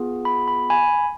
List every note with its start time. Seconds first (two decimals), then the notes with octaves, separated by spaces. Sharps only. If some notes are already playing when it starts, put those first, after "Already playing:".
Already playing: B3 F4 G#4
0.25 B5
0.48 B5
0.70 G#5 B5